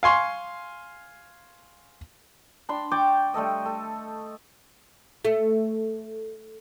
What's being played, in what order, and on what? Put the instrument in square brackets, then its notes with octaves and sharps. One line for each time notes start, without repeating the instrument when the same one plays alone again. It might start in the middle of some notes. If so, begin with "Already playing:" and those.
[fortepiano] F5 G#5 C6 C#6
[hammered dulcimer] D4 B5 C6
D5 G5 C#6 D6
G3 A3 A4 D#5
A4
[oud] A3 [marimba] A4